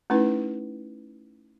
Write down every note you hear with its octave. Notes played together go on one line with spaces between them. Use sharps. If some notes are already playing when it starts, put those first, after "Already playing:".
A3 C#4 D#4 E4 B4